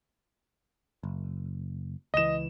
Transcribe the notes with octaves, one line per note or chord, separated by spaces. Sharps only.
F#1
C#2 E3 D#5 E7